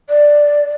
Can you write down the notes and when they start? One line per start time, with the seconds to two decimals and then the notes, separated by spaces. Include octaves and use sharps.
0.10 D5